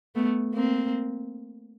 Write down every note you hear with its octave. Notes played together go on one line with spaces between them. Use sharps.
A3 B3
A#3 C4